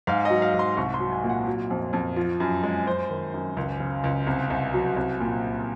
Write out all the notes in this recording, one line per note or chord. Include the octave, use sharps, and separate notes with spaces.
G#2 F5
F#3 D#5
F5
G#2
C6
C2 C#6
C6
F#3
G#5
A#2
F#5
F#3
F2
F2
F3
F#2
G#3
F#2 C5
D#3
F#2
C#2
C#3
C#2
C2
C2
F#3
C2
A#2